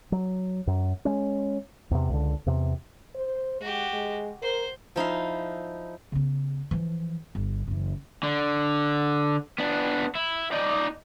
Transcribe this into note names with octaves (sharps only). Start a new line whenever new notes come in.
F#3
F#2
G#3 C#4
E2 C3
C#2 D3
E2 C3
C5
G#3 F#4 G4
G#3
A#4 C5
F3 D#4 E4 F5
C#3 B3
E3 F3
G1
F#1 E3
D3
B3 D4
E4
D#4 D5